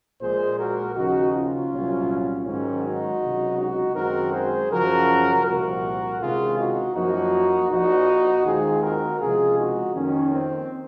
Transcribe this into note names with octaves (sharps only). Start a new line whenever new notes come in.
A#1 A#2 G#3 G#4 C5
F#4 A#4
D#2 C#3 F3 D#4 F#4
C#4 F4
C2 A#2 F#3
G#2 D#3 F#3 C#4
D#4 F#4
C#2 C3 F#3
D#4 F#4
F#2 D#3 G#3 C4 F#4 A#4
G#4 C5
F#2 C#3 F3 F#4 A#4
C2 A#2 F3 F#4 A#4
C#2 C3 D#3 G#3 F4 G#4
D#4 F#4
F#2 F3 A#3 D#4 F#4
A#1 A#2 F3 D#4 F#4
D#2 D#3 G#3 C4 F4 G#4
F#4 A#4
C#2 C3 F3 G#3 F4 G#4
D#4 F#4
F2 D#3 A#3 C#4
C4